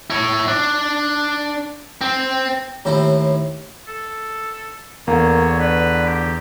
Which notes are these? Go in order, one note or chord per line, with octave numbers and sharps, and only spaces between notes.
E4 C#5
D4
C4
D#2 A2 C4 E4
A4
E2 D3 A#3 C#5
D4 B4
G4